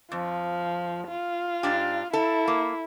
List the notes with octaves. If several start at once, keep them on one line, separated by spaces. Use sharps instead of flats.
F2 F3
F4
G#2 D4 G4
E4 A4
A#3